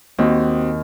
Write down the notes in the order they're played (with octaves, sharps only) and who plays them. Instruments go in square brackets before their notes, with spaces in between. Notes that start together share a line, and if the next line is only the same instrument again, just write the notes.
[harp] D#2 [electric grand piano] C4 F#4